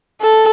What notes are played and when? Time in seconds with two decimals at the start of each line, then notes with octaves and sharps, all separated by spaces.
0.21 A4